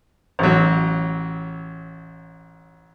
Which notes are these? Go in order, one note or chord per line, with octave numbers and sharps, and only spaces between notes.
A1 F#3